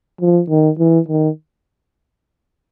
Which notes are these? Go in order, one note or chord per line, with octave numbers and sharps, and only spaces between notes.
F3
D#3
E3
D#3